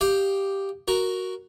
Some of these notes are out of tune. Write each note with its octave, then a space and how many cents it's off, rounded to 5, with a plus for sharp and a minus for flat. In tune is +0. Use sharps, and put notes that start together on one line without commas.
G4 +0 F5 +5 D#6 -15
F#4 +0 A#4 +0